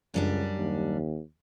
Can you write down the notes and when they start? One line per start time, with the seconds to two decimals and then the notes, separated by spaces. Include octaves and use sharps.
0.14 C#2 F#2 G3 D4
0.57 D#2